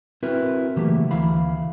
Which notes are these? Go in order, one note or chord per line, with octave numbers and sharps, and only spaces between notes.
C4 E4 F#4 A#4 B4
C#3 E3 F#3 A3 A#3 G4
D2 E3 F5 B5